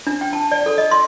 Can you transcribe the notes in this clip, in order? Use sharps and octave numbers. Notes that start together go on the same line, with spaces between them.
D4
G5
A5
D5
A4
D#5
C6